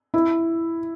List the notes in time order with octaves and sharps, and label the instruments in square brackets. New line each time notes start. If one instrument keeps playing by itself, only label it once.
[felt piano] E4